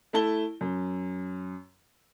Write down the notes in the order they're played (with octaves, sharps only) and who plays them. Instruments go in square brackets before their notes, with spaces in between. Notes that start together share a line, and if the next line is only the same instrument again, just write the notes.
[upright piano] A3 E4 A5 G7
F#2